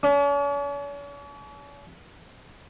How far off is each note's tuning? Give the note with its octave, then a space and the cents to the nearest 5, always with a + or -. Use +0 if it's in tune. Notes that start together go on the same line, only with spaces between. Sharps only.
C#4 +45